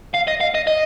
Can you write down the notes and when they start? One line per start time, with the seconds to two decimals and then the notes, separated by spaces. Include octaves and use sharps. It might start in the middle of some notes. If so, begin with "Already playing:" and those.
0.14 F5
0.28 D#5
0.41 F5
0.55 D#5
0.67 D#5